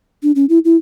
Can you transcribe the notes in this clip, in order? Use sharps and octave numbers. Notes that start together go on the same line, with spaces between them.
D4
C#4
E4
E4